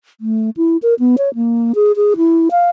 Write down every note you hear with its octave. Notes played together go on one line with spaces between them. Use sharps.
A3
E4
A#4
B3
C#5
A#3
G#4
G#4
E4
F5